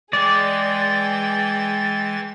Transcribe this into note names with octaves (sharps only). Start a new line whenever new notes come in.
E3 G#3 G#4 D5 G5 A6